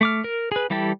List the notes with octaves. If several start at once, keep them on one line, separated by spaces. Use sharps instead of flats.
A3 D6 F6
A#4
G#4 B4
E3 G3 E4 G4 A4